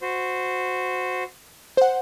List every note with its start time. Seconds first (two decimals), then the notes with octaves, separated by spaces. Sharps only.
0.02 F#4 C5
1.77 C5 F#5